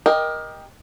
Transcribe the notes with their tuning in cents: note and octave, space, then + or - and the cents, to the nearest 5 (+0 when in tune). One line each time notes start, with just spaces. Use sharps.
G4 +15 A#4 +20 D#5 +0